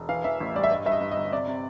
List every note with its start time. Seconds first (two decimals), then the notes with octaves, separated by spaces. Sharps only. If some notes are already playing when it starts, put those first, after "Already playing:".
Already playing: E1
0.09 E3 F5
0.24 E3 E5
0.40 A1
0.55 G3 D5
0.63 E5
0.71 G2 D#5
0.86 G2 E5
0.92 D#5
1.01 G2
1.11 D#5
1.17 G1
1.32 C3 D5
1.47 C3